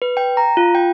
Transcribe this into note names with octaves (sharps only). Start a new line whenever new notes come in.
B4
G5
A#5
F4
G5